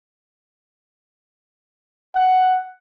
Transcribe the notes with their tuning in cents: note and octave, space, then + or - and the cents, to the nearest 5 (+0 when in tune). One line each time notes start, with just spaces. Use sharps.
F#5 +5